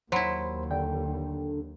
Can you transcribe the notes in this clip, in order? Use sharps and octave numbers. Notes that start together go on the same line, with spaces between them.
D#2 F#3 E4 C5 B5 C6
D3 G5